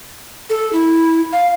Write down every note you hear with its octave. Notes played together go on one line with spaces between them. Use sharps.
A4
E4
F5